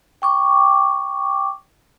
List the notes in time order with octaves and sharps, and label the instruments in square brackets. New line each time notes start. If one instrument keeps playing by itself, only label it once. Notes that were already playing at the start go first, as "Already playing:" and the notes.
[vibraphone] G5 C#6 D6